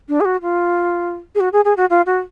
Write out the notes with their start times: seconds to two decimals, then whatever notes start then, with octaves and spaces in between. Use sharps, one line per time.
0.09 D4
0.21 G#4
0.25 F#4
0.42 F4
1.35 G#4
1.40 F#4
1.53 G#4
1.65 G#4
1.77 F#4
1.90 F4
2.06 F#4